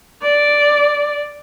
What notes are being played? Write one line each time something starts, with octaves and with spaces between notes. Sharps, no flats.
D5